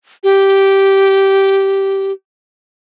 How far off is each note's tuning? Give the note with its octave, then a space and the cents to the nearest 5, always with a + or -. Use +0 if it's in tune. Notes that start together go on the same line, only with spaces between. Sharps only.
G4 -10